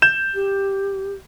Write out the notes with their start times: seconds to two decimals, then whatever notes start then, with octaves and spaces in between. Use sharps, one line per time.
0.02 G6 E7
0.35 G4